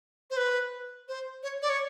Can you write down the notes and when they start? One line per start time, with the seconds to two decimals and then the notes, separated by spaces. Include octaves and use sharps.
0.30 C5
0.37 B4
1.08 C5
1.43 C#5
1.62 D5
1.70 C#5